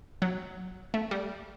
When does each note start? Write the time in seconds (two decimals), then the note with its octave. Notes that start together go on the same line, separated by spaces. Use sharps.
0.22 F#3
0.94 A3
1.11 G3